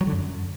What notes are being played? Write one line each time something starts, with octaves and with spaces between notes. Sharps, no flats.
F#3
D3
F#2